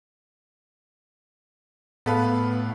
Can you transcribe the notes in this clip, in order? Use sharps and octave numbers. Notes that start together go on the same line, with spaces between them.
A2 B3 A4 B4 F5